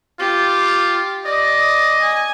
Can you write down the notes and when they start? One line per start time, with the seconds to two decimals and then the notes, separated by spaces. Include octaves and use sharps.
0.20 F4 G4
1.26 D5 D#5
2.01 G#5